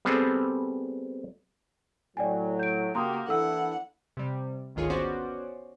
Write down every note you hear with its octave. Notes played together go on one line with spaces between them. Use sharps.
G3 B3 C4 G#4 A4
A2 F#3 D5 G5 G#5
G6 D7
C#3 A#3 F#4 G4 A#5 C6 D#6
E3 D4 E4 A4 F#5 E6
C3 G3
G#1 D2 D#3 F4 G#4 C#5
B3 C#4 F#4 C5 D5